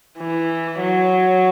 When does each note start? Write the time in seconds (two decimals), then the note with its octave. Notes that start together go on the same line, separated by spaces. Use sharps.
0.18 E3
0.80 F#3